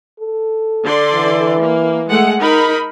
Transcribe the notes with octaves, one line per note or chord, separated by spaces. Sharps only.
A4
D3 D5 C6
E3
A#3
G#3 A3 F#5
D#4 A#4 B5